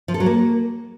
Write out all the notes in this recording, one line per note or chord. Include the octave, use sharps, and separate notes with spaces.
F3
A4
F#3
A#3